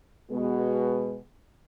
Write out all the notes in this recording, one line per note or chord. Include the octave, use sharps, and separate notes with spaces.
B2 G#3 B3